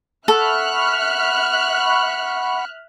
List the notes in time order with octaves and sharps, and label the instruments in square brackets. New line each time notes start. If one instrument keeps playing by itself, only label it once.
[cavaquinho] A4 [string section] E5 F6 F#6 [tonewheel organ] F#5 B5 C#6